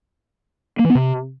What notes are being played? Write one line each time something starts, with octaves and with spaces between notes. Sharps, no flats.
A#3
E3
B3
C3